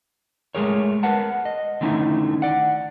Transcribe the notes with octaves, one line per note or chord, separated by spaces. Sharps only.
G#3 A3 C4 G#4 A#4 C#5
A#4 B4 F#5 A5
D#5
D3 D#3 A3 C#4 D#4 E4
D5 F#5